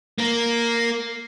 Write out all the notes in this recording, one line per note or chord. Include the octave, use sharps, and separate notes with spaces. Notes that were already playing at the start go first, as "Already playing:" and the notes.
A#3 A#4